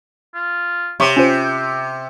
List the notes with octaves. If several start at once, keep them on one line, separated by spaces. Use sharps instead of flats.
F4
C3 C#5 C#6
C#4 F4 C5 G5